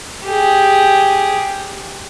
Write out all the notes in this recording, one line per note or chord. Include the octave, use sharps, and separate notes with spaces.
G4 G#4